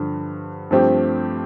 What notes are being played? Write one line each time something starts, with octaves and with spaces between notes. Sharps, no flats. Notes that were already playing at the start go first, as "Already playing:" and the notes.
Already playing: G2 D3 F3
G2 F3 A3 C4 G4